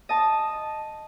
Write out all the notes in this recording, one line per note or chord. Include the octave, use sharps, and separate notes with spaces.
D#5 A5